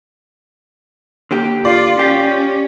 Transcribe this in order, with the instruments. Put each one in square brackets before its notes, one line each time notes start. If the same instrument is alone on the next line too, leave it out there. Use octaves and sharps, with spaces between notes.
[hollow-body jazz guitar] D3 A#3 G4
[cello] F4 [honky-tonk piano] D5
[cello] C#4 [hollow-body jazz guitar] G4